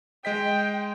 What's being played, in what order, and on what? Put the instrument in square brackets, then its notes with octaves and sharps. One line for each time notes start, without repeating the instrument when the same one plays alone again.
[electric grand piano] G#3 D#5 B6 [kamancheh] G5